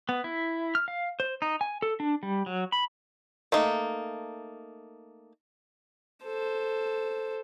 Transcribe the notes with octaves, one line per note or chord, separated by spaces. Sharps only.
B3
E4
F6
F5
C5
D#4
G#5
A4
D4
G3
F#3
B5
A3 A#3 D#4
A4 C5